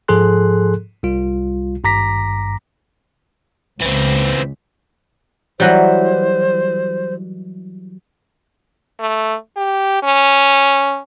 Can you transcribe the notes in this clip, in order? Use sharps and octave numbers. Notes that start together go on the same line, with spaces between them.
G#2 F3 G#4 A4 C6 F#6
C2 G3 F4
G#1 G2 A#5 D6 A#6 B6
C#2 E3 C4
E3 F#3 G3 C5
A3
G4
C#4